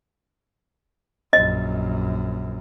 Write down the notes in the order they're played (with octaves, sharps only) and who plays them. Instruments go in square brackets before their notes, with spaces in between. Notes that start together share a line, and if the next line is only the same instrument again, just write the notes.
[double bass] A#1 F#2 [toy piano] D#5